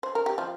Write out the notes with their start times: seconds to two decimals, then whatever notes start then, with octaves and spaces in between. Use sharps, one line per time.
0.03 C5
0.15 A#4
0.26 G4
0.38 F3 F4